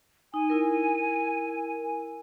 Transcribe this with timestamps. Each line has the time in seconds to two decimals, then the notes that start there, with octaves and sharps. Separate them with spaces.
0.34 D#4 G#5
0.50 E4 A#4